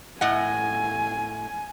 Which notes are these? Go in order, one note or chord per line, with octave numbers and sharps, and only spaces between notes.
A2 D#5 F#5 G#5